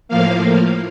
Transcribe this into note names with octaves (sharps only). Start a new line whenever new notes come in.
A2 F3 A#3 F5